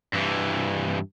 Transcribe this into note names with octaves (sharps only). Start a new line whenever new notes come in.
G2 E3